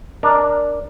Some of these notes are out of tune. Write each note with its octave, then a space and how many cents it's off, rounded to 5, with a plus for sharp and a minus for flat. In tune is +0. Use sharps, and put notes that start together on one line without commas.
D4 +0 A#4 +0 D#5 +0